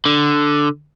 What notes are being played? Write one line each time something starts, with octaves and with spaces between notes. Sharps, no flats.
D3